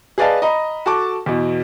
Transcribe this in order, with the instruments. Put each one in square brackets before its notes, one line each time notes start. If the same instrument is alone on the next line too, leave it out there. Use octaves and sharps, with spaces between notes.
[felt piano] G#4 B4 D5 D#5 F5 A5
D#5 A#5 B5
F#4 A4 A5 D6
E2 B2